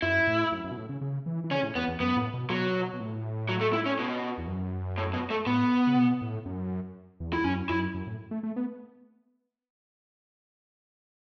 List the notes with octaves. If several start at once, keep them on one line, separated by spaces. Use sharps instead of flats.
F#2 E4
A2
F#2
F#2
B2
A2
C#3
C#3
E3
E3
C#3 C#4
A2
E2 B3
E2
F#2 B3
A2
B2
B2 F#3
B2
B2
A2
F#3
A3
E4
C#4
B2
E2
F#2
A2
B2
A3
A2 B3
C#3
B2
A2
F#2
E2
E4
F#2 C#4
F#2 E4
F#2
A2
A3
A3
B3